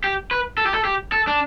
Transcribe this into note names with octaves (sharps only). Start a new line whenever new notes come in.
G4
B4
A4
G4
A4
G4
A4
D4